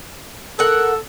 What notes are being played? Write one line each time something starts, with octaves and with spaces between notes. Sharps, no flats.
A4 A#4 F#5